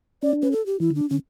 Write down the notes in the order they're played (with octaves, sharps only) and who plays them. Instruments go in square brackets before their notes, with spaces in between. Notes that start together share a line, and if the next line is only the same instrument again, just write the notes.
[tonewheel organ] C#4 [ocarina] D5
[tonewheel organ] D4
[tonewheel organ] C#4 [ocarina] B4
[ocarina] A4
G4
[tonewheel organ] E3 [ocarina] E4
[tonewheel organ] D3 [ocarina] D4
[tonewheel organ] D3 [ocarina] C#4